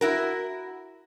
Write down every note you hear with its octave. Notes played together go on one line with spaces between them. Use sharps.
E4 F#4 A#4